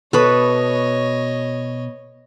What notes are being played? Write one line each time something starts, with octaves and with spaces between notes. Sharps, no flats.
B2 A4 B4 C#5 D#5 B5